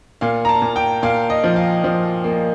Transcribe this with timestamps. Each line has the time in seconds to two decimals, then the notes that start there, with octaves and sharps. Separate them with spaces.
0.21 A#2 F5
0.45 A#5
0.49 A5
0.62 A#2
0.76 G5
1.03 A#2 F5
1.30 D#5
1.44 F3
1.56 F5
1.84 F3
2.24 A#3